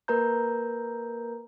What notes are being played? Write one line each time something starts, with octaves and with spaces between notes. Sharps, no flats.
A#3 A#4 B4 A#5 G6